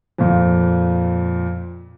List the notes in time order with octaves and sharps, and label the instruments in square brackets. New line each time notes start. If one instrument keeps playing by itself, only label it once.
[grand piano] F2 A#2